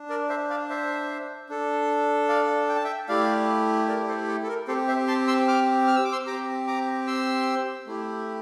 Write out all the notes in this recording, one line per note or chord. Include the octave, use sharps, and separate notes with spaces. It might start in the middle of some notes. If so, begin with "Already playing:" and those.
Already playing: D4
A#4 D5
C5 E5
D5 F5
C5 E5
D4 A4
D5 F5
G5
A5
E5 G5
A3 E4 G4 D5 F5
A#4 D5
A4 C5
A4
A4
A#4
C4 G4 A4 C5
C5 E5
A5 C6
C6 E6
D6 F6
F6
E6
D6
C6 E6
C4 G4 A#5 D6
A#5 D6
C6 E6
A3 E4 G4